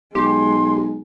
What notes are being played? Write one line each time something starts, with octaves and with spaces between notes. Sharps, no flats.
B1 G#3 G4 C6